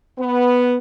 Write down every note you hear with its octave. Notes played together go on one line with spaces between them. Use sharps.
B3